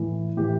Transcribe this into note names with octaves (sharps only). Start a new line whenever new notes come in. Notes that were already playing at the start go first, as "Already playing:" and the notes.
Already playing: A2 E3
A2 E3 G4